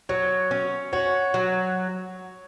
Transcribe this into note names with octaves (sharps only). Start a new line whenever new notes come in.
F#3 C#5
C#4
F#4 C#5
F#3